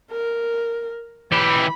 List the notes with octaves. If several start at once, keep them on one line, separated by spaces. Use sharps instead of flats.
A#4
E3 G4 B5